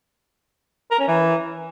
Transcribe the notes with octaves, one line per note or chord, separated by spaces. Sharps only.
A#4
C#4
E3